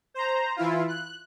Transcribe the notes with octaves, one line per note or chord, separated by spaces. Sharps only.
C5 A#5
E3 E4 F4
F#6